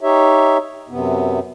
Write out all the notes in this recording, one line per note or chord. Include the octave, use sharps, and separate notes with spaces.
D#4 G4 C#5 E5
F#2 C3 B3